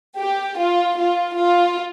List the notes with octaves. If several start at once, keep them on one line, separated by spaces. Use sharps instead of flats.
G4
F4
F4
F4